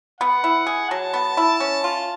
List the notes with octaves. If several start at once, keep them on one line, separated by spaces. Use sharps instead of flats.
B3 F#5
E4
G#4
F#3 A5
B3
E4
C#4
F4